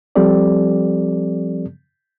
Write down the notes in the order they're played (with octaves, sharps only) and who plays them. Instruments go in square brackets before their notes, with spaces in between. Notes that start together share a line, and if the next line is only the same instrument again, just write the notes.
[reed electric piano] F3 G3 C4 G4 A4 D5